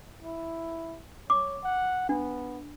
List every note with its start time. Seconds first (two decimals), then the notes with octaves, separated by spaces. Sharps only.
0.23 E4
1.30 C#5 D6
1.64 F#5
2.09 B3 D4